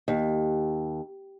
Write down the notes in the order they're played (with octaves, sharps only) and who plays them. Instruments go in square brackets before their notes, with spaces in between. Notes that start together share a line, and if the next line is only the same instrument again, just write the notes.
[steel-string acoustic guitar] D#2